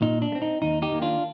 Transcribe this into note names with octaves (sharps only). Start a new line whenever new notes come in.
A#2 D#4
D4
A3
C4
D#4
D#2 D#4
D#4 G4
D#3 A#3
D4 F4